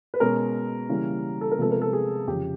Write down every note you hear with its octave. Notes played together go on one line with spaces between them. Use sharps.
B4
B2 G#3 C#4 A#4
C#3 E3 G3 A#3 C#4
A4
A#4
C3 F3 G#3 B3 A4
A#4
A4
G#4
F2 C#3 F3 G4